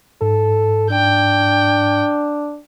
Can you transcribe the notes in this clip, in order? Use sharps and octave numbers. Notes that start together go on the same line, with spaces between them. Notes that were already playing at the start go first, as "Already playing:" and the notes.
G#2 A4
D4 G5